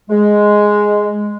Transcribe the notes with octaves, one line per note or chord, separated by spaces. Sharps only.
G#3